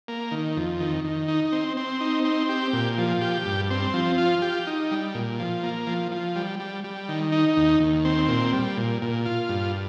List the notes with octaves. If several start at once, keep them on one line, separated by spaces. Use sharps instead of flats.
A#3
D#3
F2
D#3
D#3
D#4
C4
C4
D#4
C4
G4
A#2
F3
G4
G2
C4
F3
F4
G4
D#4
G3
A#2
F3
A#3
F3
F3
G3
G3
G3
D#3
D#4
D#2
D#2
C4
A#2
G3
A#2
A#2
F4
G2